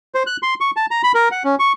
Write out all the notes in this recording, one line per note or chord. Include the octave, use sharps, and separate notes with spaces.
C5
F#6
C6
C#6
A5
A#5
B5
A#4
F#5
C#4
C#6